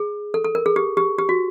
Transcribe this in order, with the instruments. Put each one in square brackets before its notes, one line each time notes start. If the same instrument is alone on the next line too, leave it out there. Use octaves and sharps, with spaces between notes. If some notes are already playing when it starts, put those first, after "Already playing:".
Already playing: [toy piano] G#4
A4
A4
A#4
G#4
G4
G4
G4
F#4